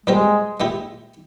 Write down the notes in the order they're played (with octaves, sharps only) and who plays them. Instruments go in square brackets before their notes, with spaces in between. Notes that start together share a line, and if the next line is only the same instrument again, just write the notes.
[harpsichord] A#2 G3 C4 G4 A#4 [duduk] G#3
[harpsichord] A#2 G#3 E4 G4